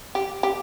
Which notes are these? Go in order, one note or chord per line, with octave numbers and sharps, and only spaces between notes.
G4
G4